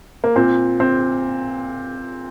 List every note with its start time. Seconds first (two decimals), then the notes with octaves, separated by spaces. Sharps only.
0.24 A#3
0.36 A#2 C4
0.80 C4